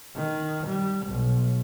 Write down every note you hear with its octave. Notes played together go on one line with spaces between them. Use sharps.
D#3
G3
B1